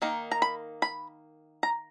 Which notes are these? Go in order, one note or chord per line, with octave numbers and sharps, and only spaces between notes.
D#3 A#3 D#4
A#5
B5
B5
A#5